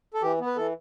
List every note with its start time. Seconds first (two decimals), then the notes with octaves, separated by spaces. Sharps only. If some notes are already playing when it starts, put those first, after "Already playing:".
0.14 A4
0.22 E3 G4
0.40 B3
0.47 B4
0.56 E3 A4